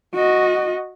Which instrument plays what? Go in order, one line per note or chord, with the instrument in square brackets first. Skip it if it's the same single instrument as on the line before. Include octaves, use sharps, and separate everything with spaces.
[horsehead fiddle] F#4 D#5